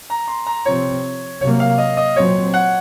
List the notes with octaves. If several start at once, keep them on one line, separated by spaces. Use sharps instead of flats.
A#5
C6
A#5
C3 F3 C4 C#5
C3 F#3 A#3 C#5
F5
D#5
D#5
A#2 F#3 C4 C#5
F#5